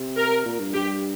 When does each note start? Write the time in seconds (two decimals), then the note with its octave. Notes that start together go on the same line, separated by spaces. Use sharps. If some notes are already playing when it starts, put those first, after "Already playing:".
Already playing: C3
0.17 A#4
0.45 A#2
0.60 G2
0.75 G2 G4